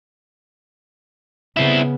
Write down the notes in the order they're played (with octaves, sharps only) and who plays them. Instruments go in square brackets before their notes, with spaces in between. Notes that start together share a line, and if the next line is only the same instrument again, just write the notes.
[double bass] C#3 B3 [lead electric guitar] C4 E4